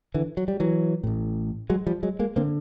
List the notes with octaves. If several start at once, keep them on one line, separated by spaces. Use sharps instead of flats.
D3 E3
F#3
G3
E3 F#3
A1 A2
F#3 G#3
F3 G3
F#3 G#3
G#3 A#3
D3 A#3 C4